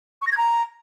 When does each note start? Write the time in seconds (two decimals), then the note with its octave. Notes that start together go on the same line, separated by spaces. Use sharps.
0.21 C#6
0.26 A#6
0.32 G#6
0.37 A#5